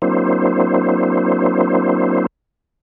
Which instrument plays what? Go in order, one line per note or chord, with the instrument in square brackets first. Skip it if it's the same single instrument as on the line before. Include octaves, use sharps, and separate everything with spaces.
[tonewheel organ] F#3 A#3 C4 D4 E4 C5